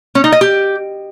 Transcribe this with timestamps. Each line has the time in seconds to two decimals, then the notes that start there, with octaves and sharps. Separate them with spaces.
0.15 C#4
0.24 D#4
0.32 D#5
0.41 G4